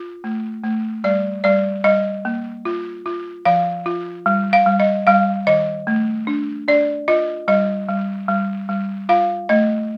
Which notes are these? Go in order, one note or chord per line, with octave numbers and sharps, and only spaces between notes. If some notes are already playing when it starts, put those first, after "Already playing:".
Already playing: F4
A3
A3
G3 D5
G3 D5
G3 D#5
A#3
F4
F4
F3 F5
F4
G3
F5
G3
D#5
G3 F5
D#3 D#5
A3
D4
D4 D5
F4 D#5
G3 D#5
G3
G3
G3
F4 F5
A3 D#5